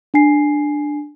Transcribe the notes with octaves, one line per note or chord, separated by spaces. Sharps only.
D4 G#5 C7